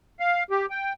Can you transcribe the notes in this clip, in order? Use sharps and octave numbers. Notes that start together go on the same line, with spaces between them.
F5
G4
G5